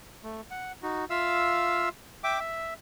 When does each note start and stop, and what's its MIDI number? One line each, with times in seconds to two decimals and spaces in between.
0.23 0.41 57
0.51 0.72 78
0.83 1.05 63
0.83 1.05 66
1.10 1.89 65
1.10 1.89 76
1.10 1.89 77
1.10 1.89 88
2.24 2.39 76
2.24 2.39 79
2.24 2.39 86
2.40 2.74 76